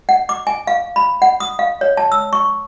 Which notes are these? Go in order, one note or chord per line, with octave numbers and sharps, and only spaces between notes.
F#5
D6
G#5
F5
B5
F#5
D#6
F5
C#5
A5
E6
C#6